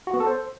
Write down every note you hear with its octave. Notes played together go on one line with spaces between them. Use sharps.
F#4
B3
A4
C5